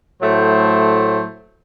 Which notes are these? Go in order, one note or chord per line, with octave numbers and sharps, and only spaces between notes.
A2 F#3 A3 C5